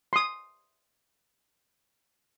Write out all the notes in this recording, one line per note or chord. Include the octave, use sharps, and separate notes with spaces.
C6 D#6